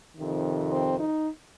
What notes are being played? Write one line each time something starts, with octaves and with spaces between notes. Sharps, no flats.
F2 C3 D#3
C4
D#4